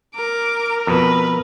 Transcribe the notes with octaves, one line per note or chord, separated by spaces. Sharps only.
A#4 D6
F2 B2 B4